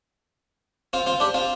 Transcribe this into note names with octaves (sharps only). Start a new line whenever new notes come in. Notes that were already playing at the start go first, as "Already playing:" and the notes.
C4 F4
C4 F4
D4 G4
C4 F4